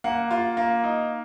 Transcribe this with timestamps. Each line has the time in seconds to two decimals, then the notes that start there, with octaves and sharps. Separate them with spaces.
0.04 A#3 F#5
0.31 F4
0.57 A#3
0.84 D#4